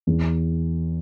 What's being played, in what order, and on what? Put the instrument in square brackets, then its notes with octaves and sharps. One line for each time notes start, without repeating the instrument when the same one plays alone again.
[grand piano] E2